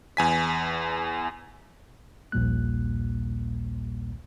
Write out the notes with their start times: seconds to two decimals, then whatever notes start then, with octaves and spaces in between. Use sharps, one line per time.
0.17 E2 G#5 B6
2.32 A#1 D#2 A#2 G3 A#3 F#6